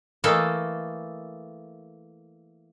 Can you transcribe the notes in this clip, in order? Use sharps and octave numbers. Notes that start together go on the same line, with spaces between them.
E3 A3 A#3 A4 D#5